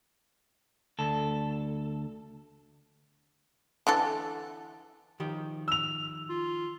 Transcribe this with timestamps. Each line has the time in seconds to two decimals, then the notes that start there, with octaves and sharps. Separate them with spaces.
0.99 D2 A4
3.87 D3 E3 A4
5.20 D#3 F3 G4
5.68 E6 F7
6.29 F4